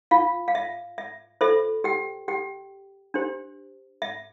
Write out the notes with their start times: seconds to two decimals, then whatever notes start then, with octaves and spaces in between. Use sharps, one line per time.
0.11 F4 F5
0.48 F5
0.55 E5
0.98 E5
1.41 F4 A4 C5 E5
1.84 G4 G5
2.28 G4 G5
3.14 D4 G4 C5
4.02 E5